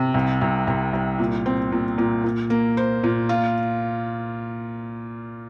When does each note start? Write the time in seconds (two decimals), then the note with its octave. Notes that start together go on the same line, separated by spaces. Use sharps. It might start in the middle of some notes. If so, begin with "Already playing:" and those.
Already playing: C3
0.14 C2
0.42 C2
0.67 C2
0.93 C2
1.19 A#2
1.46 C4
1.72 A#2
1.98 A#2
2.24 A#2
2.50 A#3
2.77 C5
3.04 A#2
3.29 F4